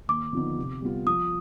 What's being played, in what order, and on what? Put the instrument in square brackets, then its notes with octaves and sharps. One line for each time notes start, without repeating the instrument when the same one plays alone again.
[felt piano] D#2 [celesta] D6
[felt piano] D3 F3 B3 D#4
C3
G3 B3 F4
[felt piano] F3 [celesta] D#6